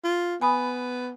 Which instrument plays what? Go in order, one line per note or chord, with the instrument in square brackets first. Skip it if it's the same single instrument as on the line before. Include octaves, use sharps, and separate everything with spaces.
[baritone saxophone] F4
[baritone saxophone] B3 [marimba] G#5 B5 D#6